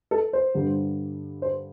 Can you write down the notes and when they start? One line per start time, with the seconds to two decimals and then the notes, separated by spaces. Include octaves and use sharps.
0.11 A4
0.33 C5
0.55 G2 D3 G3
1.42 C5